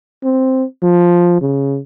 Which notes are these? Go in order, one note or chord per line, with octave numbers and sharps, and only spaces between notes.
C4
F3
C#3